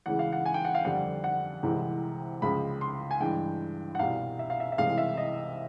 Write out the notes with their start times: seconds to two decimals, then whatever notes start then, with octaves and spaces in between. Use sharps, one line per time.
0.06 E2 C#3 E3 G#3 F#5
0.19 F5
0.33 F#5
0.46 G#5
0.54 G5
0.65 F#5
0.75 F5
0.85 F2 D3 G3 F#5
1.24 F#5
1.63 C2 C3 E3 G#3
2.42 C#2 C#3 F3 G#3 B5
2.81 C6
3.11 G#5
3.20 G2 E3 G#3 G5
3.95 F#5
3.99 C2 B2 G3 F5
4.39 E5
4.50 F5
4.60 E5
4.72 E5
4.78 C2 C3 E3 G#3 F5
4.98 E5
5.17 D#5